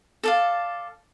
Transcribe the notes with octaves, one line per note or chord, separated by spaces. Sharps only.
A4 D5 F5